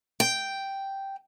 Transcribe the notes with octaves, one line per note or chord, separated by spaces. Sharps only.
G5